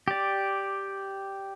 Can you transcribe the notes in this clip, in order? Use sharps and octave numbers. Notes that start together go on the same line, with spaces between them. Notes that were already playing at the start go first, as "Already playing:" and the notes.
G4 D5